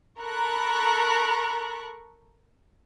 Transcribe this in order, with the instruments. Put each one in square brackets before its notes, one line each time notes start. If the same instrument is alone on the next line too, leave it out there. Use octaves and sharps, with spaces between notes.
[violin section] A4 A#4 A#5 B5 C#6 F#6